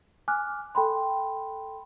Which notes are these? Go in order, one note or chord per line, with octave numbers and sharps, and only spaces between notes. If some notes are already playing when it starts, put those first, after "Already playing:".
G#5 D6 F6 F#6
A4 G5 B5 C6